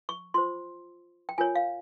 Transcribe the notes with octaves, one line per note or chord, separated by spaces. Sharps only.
C#6
F4 C5 C6
G5
F4 A#4 C#5 G#5
F5